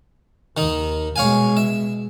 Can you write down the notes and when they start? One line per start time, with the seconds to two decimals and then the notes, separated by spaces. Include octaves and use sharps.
0.57 D#2 D#3 D#4
1.16 B2 G#3 C#5 F5 G#5
1.57 E5